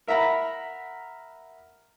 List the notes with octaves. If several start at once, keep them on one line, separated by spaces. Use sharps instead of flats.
A#4 E5 F#5 A#5 B5